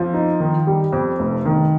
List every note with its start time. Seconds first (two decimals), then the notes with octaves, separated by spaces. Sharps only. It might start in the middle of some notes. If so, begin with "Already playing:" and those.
Already playing: F2 F3
0.14 D#4
0.40 D#3
0.67 G3
0.93 F2
1.19 F1
1.45 D#3